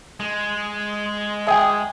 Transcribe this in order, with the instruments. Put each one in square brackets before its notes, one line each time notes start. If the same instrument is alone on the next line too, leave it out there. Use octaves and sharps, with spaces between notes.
[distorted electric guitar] G#3
[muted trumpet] G#4 [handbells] E5 G5